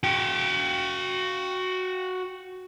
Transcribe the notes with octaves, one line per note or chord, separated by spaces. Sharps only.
F#4 G5